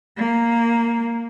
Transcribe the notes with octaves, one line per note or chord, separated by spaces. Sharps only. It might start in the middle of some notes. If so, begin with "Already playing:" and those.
A#3